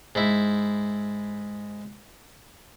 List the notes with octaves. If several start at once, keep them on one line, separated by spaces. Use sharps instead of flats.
G#2 E4